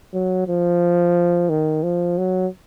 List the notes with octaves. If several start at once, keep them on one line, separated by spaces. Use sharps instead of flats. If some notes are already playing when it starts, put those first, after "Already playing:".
F#3
F3
D#3
F3
F#3